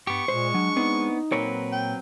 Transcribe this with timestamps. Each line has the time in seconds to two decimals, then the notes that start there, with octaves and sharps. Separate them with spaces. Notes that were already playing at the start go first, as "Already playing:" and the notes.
0.07 G2 B3 G4 C#6
0.28 A#2 G#3 C5
0.54 F#3 D4
0.76 B3 C4 D4 D#4
1.32 A#2 F#3 C4 A#4 B4 C#5
1.72 G5